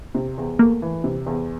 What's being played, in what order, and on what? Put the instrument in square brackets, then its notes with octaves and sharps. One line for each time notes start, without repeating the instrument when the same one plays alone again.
[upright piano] C3
E2
[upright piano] A3 [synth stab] A#3
[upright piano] E3
C3
E2